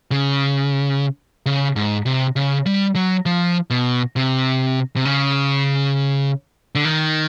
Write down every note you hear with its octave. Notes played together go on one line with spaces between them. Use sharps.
C#3
C#3
G#2
C3
C#3
G3
F#3
F3
B2
C3
C3
C#3
D3
D#3